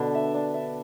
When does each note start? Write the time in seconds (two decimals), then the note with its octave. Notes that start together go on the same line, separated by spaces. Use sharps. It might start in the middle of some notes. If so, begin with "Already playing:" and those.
Already playing: B2 D3 B3 D4 B4
0.15 E5
0.34 D4
0.54 E5